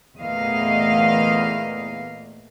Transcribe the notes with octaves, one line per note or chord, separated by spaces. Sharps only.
E2 A#2 A3 A#3 D#5 F5